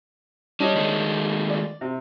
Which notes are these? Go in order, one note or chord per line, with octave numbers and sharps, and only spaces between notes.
G3 D4 C#5 D#5
D#3 G#3 A3
D5
C3